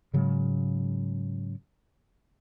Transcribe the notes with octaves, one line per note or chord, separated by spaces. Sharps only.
G#2 C#3 F#3 G#3